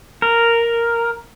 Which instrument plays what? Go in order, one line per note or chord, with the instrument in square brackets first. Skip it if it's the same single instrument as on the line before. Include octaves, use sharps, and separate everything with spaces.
[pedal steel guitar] A#4